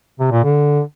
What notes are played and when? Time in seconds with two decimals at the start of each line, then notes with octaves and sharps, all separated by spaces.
0.20 C3
0.32 A#2
0.44 D3